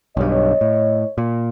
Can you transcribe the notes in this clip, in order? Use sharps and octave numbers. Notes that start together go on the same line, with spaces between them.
B1 G2 C#5 D#5
A2
A#2